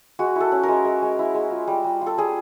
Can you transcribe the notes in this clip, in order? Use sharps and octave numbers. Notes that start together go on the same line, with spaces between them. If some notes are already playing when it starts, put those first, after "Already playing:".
G#3 F#4
E4 A4
C#4
G#3 A#4
G#3
G#3
E4
G#3
F4
G3
G3
F4 A4
G3 G#4